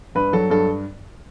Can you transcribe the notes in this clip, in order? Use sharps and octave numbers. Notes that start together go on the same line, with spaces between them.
G2 B4
F#3 A4
G2 A4